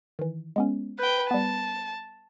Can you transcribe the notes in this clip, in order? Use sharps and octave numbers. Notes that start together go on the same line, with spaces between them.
D#3 E3
G#3 B3 C#4
B4 G5 F#6 G6
G3 B3 A5